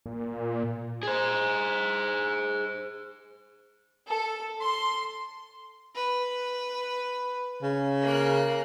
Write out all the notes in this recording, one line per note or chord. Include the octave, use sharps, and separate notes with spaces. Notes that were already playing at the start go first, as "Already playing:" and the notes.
A#2
G#4 C5
A4
C6
B4
C#3
A#3 F#6